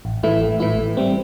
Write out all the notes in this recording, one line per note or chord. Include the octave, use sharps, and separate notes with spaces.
A1
A2 E3 A3 E4
A1
A2 E3 A3 E4
A2
G3 C4